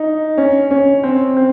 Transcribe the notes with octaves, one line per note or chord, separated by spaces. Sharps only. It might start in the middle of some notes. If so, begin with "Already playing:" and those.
Already playing: D#4
C#4
C#4
C4
C4